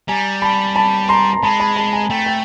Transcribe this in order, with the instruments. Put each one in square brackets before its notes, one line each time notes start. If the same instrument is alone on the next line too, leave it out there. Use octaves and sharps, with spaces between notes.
[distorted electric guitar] G3 [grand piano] G#5 A#5
[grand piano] A5 B5
A5 B5
A#5 C6
A#5
[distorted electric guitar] G#3 [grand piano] A5 B5
[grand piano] A5 B5
A5 B5
G#5 A#5
[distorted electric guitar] A3 [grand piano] G5 A5
[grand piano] G5